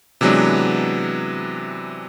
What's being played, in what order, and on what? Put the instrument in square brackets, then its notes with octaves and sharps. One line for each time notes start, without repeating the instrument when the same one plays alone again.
[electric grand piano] C3 E3 F#3 G#3 B3 D4